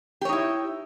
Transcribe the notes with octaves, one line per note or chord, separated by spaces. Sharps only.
D#4 E4 G4 C#5